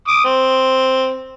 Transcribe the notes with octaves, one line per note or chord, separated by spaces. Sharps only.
D6 D#6
C4